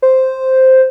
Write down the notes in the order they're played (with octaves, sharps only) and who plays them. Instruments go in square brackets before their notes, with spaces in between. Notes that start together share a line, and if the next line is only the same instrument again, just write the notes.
[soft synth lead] C5